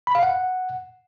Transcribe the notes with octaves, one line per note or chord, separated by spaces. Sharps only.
B5
F5
F#5